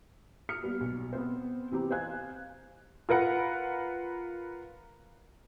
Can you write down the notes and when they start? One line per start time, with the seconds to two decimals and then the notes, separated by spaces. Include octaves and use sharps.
0.49 D#6 F6 C#7
0.62 G3 A#3 B3
0.81 B1
1.13 B3 C4 C5
1.71 C3 E3 C4 G4 A#5
1.91 C5 D#5 F5 G#5 F#6 G#6
3.09 F4 A#4 B4 F#5